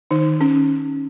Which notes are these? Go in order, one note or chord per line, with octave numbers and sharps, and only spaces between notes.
D#3 D#4
C#4